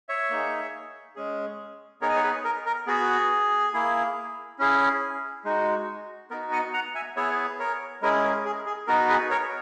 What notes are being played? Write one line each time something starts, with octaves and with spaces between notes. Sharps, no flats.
C#5 E5
A#3 D#4 G#4
G#3 C#4 G#4
B3 D#4 G#4 A#4 C#5
D#5
C#5
G#4 B4
A#4
A#4
B3 F#4 G#4
A#3 E4 G#4
C#4 E4 G#4
G#3 D#4 F#4
B3 D#4 F#4 A#4
D#5 F#5
F#5 A#5
E5 G#5
B3 E4 G#4 C#5 E5
A#4 C#5
G#3 C#4 E4 G#4 A#4
A#4
G#4
G#4
B3 D#4 F#4 A#4
G#4 B4
A#4 C#5